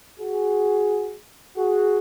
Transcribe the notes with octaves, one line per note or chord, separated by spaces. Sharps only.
F#4 G#4
F#4 G#4